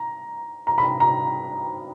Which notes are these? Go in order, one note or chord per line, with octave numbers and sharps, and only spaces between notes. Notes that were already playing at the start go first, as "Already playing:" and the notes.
Already playing: A#5
A#5
B5
A#5